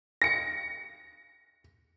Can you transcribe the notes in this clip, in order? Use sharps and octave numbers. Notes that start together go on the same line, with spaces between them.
A#6 C#7